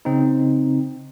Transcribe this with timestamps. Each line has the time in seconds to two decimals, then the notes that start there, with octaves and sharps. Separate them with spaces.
0.05 C#3 C4 D#4